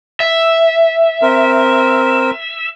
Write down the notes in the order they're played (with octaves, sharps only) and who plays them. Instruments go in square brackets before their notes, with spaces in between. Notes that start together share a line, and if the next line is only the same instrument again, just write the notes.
[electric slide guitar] E5
[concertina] C4 A#4